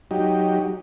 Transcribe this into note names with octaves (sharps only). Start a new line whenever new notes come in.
F#3 D#4 G4